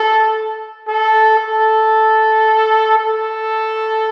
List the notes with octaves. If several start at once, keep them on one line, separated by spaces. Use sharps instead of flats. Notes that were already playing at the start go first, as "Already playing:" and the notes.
Already playing: A4
A4
A4
A4